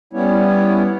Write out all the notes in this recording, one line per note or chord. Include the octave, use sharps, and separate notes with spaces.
G3 B3 C#4 E4 C#5